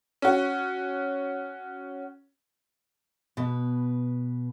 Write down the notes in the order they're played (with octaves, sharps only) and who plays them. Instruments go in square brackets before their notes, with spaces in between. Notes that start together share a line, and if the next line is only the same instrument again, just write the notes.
[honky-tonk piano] C#4 F#4
[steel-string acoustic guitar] B2 B4